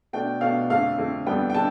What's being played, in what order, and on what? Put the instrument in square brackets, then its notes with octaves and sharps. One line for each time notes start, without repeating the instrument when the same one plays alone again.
[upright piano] B2 A3 D4 G5
B2 A3 D4 F5
F2 D3 A3 F5
F2 D3 A3
F2 D3 G3 B3 G5
G5
D3 A5